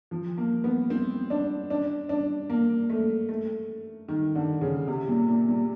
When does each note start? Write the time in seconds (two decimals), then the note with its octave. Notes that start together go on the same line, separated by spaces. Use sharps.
0.11 F3
0.37 A#3
0.64 B3
0.90 C4
1.30 D4
1.70 D4
2.09 D4
2.50 A#3
2.90 A3
3.29 A3
4.08 D#3
4.35 D3
4.61 C#3
4.88 C3
5.09 A#2
5.28 A#2
5.48 A#2